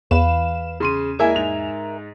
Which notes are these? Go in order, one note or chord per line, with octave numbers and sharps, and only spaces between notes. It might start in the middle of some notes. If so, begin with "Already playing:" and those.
E2 B4 F5 E7
C#3 C6 D#7
G#3 A#3 E4 A#4 E5 G#5
G#2 F7